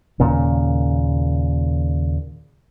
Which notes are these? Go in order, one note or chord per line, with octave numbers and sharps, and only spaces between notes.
D#2 A#2 C#3